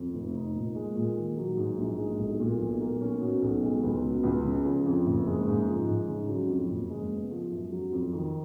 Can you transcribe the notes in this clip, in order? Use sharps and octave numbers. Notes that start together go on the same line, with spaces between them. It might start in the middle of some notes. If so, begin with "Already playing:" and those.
Already playing: F2
F1
D#4
A#2
G#3
A#2
D#3
F#3
G#2
A#1
G#3
B1
A#2
B1
A#3
C#4
B2
B1
G#3
C#2
B2
C#2
C#3
F3
F2
F#1
G#3
G#2
F3
G#2
C#3
F#3
F2
F#1
G#3
B3
F3
F#2
F#3
F2
D#3